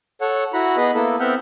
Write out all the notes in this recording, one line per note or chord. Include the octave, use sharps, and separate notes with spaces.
A4 C#5 F#5
E4 F#4 F#5 A#5 B5
B3 G#4 B4 D#5 B5
A#3 B3 E4 A4
B3 C4 E5 F#5 F6 G6